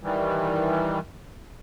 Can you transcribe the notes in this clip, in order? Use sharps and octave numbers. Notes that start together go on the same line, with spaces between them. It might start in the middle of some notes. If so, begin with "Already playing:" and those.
D#3 E3 G3